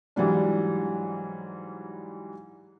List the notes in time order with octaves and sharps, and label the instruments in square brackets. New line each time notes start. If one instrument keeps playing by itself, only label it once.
[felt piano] G#2 E3 F#3 G3 D4